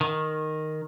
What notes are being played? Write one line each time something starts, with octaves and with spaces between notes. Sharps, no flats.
D#3